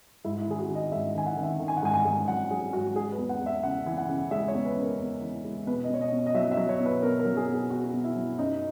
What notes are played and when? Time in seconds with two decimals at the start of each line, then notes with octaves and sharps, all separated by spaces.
0.24 G#2 E4
0.42 E4
0.47 D#3 G#4
0.59 F#4
0.70 D#3
0.75 D#5
0.92 G#2 E5
1.15 D#3 G#5
1.26 F#5
1.37 D#3
1.43 E5
1.60 D#3
1.68 G#5
1.77 F#5
1.83 G#2 G#5
1.94 G#5
2.05 G#2
2.28 F#3 F#5
2.50 F#3 G#4
2.73 G#2 F#4
2.95 G#3 G#4
3.12 B4
3.18 E2
3.29 F#5
3.41 E2
3.46 E5
3.63 C#3 F#5
3.86 E3
3.98 F#5
4.09 C#3
4.31 G#3 E5
4.48 C#5
4.54 E2
4.65 B4
4.76 C#3
4.82 A#4
4.99 E2
5.21 E3
5.44 G#3
5.67 B2 B4
5.84 D#5
5.89 B2 C#5
6.01 D#5
6.12 B2
6.26 D#5
6.34 F#3 E5
6.52 E5
6.57 F#3
6.69 C#5
6.80 B2
6.86 B4
7.02 B2 A#4
7.19 A#4
7.25 F#3
7.37 G#4
7.48 B2
7.54 G#4
7.70 B2 F#4
7.93 B2
8.04 E4
8.16 F#3
8.38 F#2 D#4